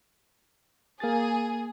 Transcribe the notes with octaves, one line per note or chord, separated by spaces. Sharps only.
A#3 G#4 A6